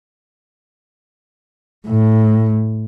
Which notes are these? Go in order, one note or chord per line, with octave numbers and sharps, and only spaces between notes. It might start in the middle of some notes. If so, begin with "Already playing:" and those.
A2